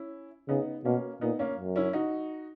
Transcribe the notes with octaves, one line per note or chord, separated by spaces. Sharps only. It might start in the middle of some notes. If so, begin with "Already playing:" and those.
Already playing: C#4 E4
C#3 B3 D#4
B2 A#3 C#4
A#2 B3 D#4
A#3 C#4
F#2
C#4 E4
D#4 F#4